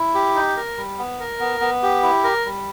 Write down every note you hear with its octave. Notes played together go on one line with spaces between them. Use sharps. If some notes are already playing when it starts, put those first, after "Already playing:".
Already playing: E4
G4
D#4
A#4
G3
B3
A#4
B3
B3
G4
E4
A#4
G3